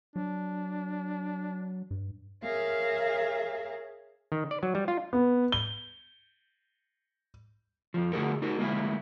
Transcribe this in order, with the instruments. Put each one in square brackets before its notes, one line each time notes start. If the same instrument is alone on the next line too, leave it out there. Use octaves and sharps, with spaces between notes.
[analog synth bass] F#3 [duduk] D4
[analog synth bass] G2
[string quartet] G#4 A#4 C#5 E5 F5
[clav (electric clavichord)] D#3
D5
F#3
G3
F4
[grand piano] B3
G7
[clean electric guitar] F2 F3
D3 A3 F#4 G#4 A#4
D#4 F#4 A#4
D2 G#3 A#3 E4